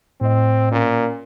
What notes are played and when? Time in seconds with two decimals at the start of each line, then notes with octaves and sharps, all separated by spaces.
0.21 A2 C4 D#5
0.72 A#2 C#4 A#4